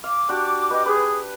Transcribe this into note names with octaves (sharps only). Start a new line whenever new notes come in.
F5 D6
D4 F#4 G4
G4 B4 D#5
G#4 B4